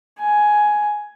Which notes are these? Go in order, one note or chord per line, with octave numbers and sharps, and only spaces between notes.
G#5